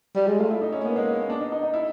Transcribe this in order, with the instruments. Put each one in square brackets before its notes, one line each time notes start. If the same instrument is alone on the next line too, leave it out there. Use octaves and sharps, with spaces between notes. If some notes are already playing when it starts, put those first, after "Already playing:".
[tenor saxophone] G3
G#3
[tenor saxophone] A3 [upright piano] F4
[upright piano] E4
D#4
C#4
[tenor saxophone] A#3 [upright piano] B3
[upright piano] G#3
D4
D#4
D#4
D#4
E4